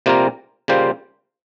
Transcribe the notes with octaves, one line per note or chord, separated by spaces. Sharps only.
C3 G3 A#3 F4 A#4
C#3 G3 A#3 F4 C5